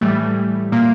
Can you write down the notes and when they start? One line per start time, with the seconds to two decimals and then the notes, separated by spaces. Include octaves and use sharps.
0.01 A2 E3 G3 A3
0.72 A#2 A#3